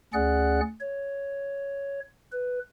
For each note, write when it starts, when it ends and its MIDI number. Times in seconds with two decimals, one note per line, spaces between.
0.14 0.61 38
0.14 0.61 61
0.14 0.61 68
0.14 0.61 74
0.14 0.61 78
0.14 0.61 90
0.81 2.00 73
2.33 2.60 71